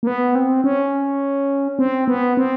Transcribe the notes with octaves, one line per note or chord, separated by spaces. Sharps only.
A#3
B3
C4
C#4
C4
B3
C4